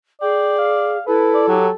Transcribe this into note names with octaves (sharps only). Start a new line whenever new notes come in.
G#4 D5 G5
F5
E4 A4 B4
D5
F#3 G4